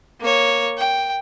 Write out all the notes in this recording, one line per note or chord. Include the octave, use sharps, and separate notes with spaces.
A#3 C#5
G5